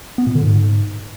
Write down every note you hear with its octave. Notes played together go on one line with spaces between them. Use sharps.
B3
A#2
D3
G#2